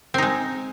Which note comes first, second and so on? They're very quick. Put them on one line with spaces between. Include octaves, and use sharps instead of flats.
C4 D#4 G#3